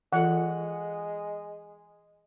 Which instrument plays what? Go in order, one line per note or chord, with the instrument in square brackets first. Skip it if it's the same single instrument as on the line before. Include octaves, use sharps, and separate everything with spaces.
[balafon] E3 F4 A4 [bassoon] G#3 [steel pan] F#5